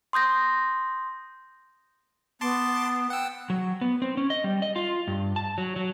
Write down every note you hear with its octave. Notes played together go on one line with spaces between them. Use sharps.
C6 D#6 G6 A#6
B3 A5 C6 D6
F#5 G5 E6
F#3
B3
C4
C#4
D#5
G3
D#5
F4
G2
A5
F#3
F#3